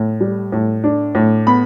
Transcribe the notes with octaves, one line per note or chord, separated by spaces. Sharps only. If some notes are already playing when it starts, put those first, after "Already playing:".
Already playing: A2
G3
A2
D4
A2
B3 B5